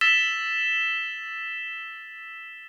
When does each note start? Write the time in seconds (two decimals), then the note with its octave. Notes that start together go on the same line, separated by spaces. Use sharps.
0.01 E6 A6 B6 E7 G7